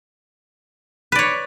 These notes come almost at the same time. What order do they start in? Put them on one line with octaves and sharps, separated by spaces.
B4 D5 C#5